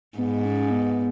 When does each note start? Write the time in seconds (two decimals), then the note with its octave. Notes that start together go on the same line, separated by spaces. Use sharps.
0.18 G#2 B3
0.45 C#4
0.71 B3